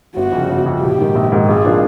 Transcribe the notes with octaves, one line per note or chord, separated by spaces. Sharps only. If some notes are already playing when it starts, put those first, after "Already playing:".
G1 F#4
F2 C#3
G1
F2 C#3
A#1 G4
G#2 D#3
A#1
G#2 D#3
G#1 G#4
F3 A#3 D4